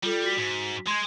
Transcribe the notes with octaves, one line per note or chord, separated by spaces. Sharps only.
G3 F4 A4
F#4 B6
G#2
G#3 C6 G#6